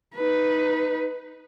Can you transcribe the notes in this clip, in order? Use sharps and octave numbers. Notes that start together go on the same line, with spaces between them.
D#4 B4